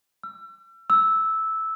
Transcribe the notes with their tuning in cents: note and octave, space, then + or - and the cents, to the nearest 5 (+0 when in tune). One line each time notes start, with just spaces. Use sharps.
E6 +40
E6 -10